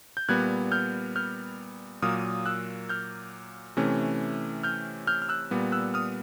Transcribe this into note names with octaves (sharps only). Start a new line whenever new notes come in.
G6
A#2 G3 B3 F#6 G#6
F6 G6
F6 G6
A#2 F#3 A#3 D#6 F6
E6 F#6
F6 G6
C3 E3 A3 C#4
F6 G6
F6 G6
F6
E6 F#6
A#2 G3 B3
E6 F#6
D#6 F6